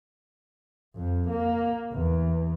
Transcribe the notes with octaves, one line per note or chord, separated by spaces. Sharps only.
F2
A#3
E2